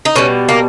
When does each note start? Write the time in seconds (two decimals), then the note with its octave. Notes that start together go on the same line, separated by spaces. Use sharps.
0.05 D#4
0.16 B2 G3 C#4
0.49 A#3